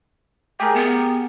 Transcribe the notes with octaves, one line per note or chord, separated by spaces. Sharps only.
A3 G4 G#4 A#4
B3